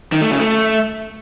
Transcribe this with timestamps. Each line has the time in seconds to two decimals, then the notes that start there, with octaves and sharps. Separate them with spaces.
0.12 D#3
0.22 A3
0.31 C#3
0.40 A3